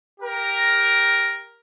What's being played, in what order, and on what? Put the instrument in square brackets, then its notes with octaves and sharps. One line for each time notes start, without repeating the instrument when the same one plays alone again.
[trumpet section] G4 A#4